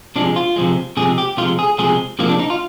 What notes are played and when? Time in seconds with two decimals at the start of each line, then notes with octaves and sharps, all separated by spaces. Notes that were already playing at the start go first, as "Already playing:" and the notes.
0.16 C3 F3 G#3 D4
0.36 F4
0.56 C3 F3 G#3
0.97 C3 F3 G#3 G#4
1.18 G4
1.37 C3 F3 G#3 F4
1.59 G#4
1.78 C3 F3 G#3 G#4
2.19 C3 F3 G#3 A#3
2.29 D4
2.39 D#4
2.50 F4